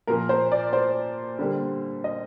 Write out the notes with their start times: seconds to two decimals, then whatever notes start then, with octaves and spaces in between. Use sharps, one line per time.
0.07 A#2 F3 A#3 A#4
0.29 C5
0.52 D5
0.73 C5
1.39 D3 G3 A#3
2.04 D#5